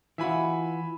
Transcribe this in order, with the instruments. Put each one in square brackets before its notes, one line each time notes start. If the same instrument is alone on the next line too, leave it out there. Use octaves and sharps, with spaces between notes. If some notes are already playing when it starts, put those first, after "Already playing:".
[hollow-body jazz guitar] E3 F4 F#4 [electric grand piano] E5 G#5 B5